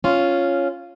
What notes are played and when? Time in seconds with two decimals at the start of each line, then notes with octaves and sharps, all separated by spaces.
0.04 C#4 F4